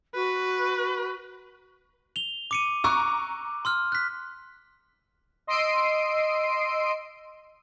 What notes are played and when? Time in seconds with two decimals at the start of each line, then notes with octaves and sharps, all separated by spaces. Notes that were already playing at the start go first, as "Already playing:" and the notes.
0.15 F#4 B4
2.16 F7 G7
2.51 D6 C#7 D#7
2.84 A#5 C#6 D6 E6 F#6
3.65 C6 E6 F6
3.92 F#6 B6
5.47 D#5 C6 E6 C7 D7 D#7